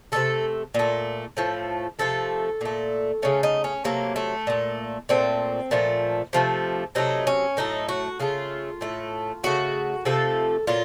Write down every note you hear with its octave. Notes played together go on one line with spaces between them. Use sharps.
C3 D#3 A3 A4
A#2 A3
A2 F3 A3
C3 F3 A3 A4
A#2 A3
C#3 A3 C#4
D#4
C#4
C3 F#3 A3 A#3
A3
A#2 A3
A#2 A3 C4
A#2 F3 A3
C3 F3 A3
C3 F#3 A3 D#4
C#4
A2 F#3 A3 D#4
F#4
C#3 A3 F4
A2 A3
C#3 A3 F#4
C3 F3 A3 A4
A#2 F#3 F4